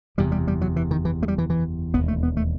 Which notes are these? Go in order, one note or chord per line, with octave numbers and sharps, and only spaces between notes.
F#1 E2 C3 G3
G3
G3
F#3
E3
D#3
E3
A3
G3
E3
E3
E1 D#2 B3
A3
B3
A3